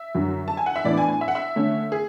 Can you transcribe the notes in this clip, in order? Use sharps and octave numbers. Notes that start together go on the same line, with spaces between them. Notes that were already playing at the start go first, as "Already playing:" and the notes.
Already playing: E5
F#2 D3 F#3
A5
G#5
F#5
E5
A2 E3 B3 D4 D5
G#5
G#5
E5
F#5
E5
D3 A3 C#4
G#4